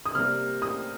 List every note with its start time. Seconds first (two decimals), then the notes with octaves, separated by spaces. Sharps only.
0.05 D#6
0.15 C3 G3 A#3 F6
0.62 D#6